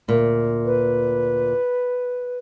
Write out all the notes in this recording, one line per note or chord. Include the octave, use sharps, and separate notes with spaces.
D2 A#2
B4